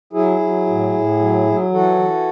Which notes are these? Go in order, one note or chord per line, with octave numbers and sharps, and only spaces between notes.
F#3 E4 G#4
F#3
A2
A2
F#3
F#3
E3 F#4 A4
E3